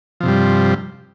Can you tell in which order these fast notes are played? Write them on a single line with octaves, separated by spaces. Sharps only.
F3 C3 G2 G3